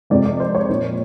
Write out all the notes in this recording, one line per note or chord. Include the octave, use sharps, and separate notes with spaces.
F2 C3 F3 G#3 D5
D5
C5
C#5
A#2 F3 A#3